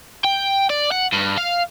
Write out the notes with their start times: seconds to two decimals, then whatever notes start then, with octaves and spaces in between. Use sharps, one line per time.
0.24 G5
0.70 D5
0.92 F#5
1.13 G2
1.38 F5